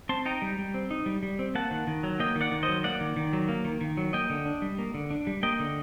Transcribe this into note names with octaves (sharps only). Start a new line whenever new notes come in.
C4 A5 C6
D#4 G5 A#5
G3
G3
C4
D#4
G3
G3
C4
A#3 F#5 A5
D#3
D#3
F#3
A#3 D#5 G5
D#3
D5 F#5
D#3
C5 D#5
F#3
A#3 D5 F#5
D#3
D#3
F#3
A#3
D#3
D#3
F#3
A#3 D#5 G5
D3
D4
G3
A#3
D3
D4
G3
A#3 D#5 G5
D3